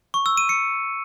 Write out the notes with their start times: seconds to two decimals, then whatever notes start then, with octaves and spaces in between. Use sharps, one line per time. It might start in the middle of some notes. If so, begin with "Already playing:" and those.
0.14 C#6
0.26 E6
0.37 D#7
0.49 C#7